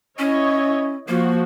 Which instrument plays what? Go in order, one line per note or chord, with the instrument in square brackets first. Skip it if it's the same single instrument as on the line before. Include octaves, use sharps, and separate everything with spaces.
[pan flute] C#4 [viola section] E4 C#5 D#5
[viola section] F3 F#4 [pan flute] A#3